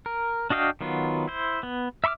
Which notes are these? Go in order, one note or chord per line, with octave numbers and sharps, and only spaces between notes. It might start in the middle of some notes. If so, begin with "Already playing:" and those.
A#4
D4 F#4 D#5 F5 G5
D#3 F#3 B3 F4
E4 C5
B3
E5 B5 C#6 D6 F6